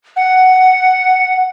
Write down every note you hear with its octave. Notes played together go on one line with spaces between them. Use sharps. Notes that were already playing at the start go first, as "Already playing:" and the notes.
F#5